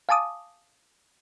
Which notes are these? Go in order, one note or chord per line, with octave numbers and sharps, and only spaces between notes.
F5 G#5 A5 D6 D#6